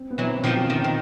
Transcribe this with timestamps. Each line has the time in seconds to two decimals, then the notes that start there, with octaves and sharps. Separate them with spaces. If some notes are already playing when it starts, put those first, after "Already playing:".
Already playing: C4
0.11 B3
0.18 E3 F#3
0.27 C4
0.44 D#3 F3 C#4
0.56 F4
0.69 D#3 F3 D#4
0.82 D#3 D#4